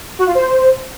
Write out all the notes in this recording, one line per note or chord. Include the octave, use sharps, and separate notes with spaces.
F#4
F4
C5